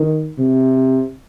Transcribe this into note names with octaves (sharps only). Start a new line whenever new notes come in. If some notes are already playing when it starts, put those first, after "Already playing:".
Already playing: D#3
C3